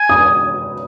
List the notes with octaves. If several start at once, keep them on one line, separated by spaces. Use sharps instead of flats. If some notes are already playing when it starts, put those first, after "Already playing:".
Already playing: G#5
D#6